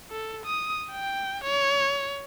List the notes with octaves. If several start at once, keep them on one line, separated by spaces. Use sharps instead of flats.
A4
D#6
G5
C#5